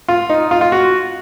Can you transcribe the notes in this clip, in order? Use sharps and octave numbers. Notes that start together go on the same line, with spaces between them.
F4
D#4
F4
F4
F#4